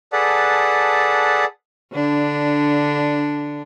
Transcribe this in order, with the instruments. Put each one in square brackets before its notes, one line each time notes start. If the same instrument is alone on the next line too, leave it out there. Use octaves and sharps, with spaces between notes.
[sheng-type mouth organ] G#4 A4 B4 D5 F#5 A5
[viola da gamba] D3 D4